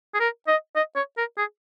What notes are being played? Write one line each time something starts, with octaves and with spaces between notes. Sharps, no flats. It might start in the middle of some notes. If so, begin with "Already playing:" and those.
G#4
A#4
D#5
D#5
C#5
A#4
G#4